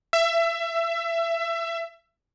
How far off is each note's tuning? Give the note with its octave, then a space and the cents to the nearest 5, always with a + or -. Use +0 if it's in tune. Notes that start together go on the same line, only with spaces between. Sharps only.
E5 +25